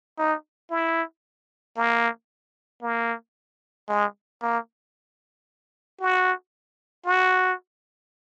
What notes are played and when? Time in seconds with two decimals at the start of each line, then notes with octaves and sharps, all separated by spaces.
0.18 D#4
0.71 E4
1.76 A#3
2.82 A#3
3.89 G#3
4.42 A#3
6.01 F#4
7.06 F#4